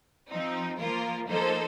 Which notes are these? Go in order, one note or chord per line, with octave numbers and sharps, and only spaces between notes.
F3 C4 D#4
F3 A#3 F4 A#4
F3 A#3 D#4 A4 C5